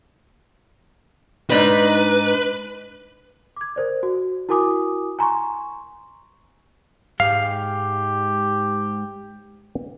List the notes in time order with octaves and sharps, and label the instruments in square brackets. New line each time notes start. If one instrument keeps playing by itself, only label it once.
[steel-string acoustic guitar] G#2 D4 D#4 [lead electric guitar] B4
[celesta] D6 G#6
A#4 C5 D5
F#4
E4 F#4 A#4 G#5 D6 D#6
G#5 A#5 C6 C#6
[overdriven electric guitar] G#2 [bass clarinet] G4 [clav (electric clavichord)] F5